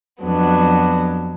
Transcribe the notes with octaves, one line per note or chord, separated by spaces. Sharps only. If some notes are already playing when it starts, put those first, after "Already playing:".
F2 F#3 B3 D4